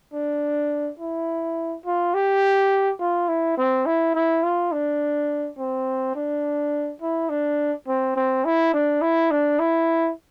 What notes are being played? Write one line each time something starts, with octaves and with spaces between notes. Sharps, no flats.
D4
E4
F4
G4
F4
E4
C4
E4
E4
F4
D4
C4
D4
E4
D4
C4
C4
E4
D4
E4
D4
E4